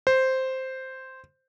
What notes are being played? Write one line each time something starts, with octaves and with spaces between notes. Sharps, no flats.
C5